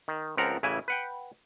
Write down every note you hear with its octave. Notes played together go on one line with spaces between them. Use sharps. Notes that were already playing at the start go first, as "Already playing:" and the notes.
D#3
C#2 F3 C4 A#4 F#5 A#5
A1 C#3 E3 E4 G#5
B4 F#5 G5